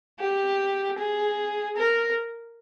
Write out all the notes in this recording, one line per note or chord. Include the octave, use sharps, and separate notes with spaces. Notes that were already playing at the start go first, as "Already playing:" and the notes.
G4
G#4
A#4